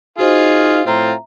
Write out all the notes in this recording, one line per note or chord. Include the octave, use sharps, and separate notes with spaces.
D#4 F4 F#4 G#4 C5 D#5 F5
A2 C4 F4 E5 A#5